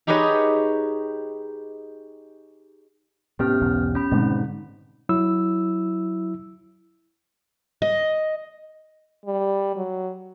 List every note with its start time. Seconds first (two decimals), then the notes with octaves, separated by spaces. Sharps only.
0.07 D#4 G4 G#4 B4 C#5 D#5
3.39 A2 C3 B3 C#4 G4 F6
3.61 B1 E2 G#2
3.95 C#4 B5
4.11 G#2 B2 D3 D#3 C4
5.09 F#3 E4 E6
7.82 D#5
9.26 G3
9.77 F#3